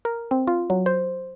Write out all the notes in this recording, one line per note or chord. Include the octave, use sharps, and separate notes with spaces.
A#4
C4
F4
F#3
C5